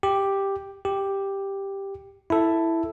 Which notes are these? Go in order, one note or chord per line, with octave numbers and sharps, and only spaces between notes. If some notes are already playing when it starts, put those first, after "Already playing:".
G4
G4
E4 A4